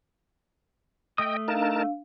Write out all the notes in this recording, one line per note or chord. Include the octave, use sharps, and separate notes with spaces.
A3 D#5 G5 D#6
D4 D#4 A#4 F5 A5